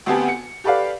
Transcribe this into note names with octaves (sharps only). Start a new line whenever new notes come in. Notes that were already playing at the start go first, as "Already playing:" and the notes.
D2 B3 C4 G4 G#5 A5
C#7
G4 A4 B4 D5 F5